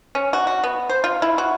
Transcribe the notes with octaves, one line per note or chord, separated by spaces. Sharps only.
C#4
F#4
F#4
B3
C5
F4
E4
F#4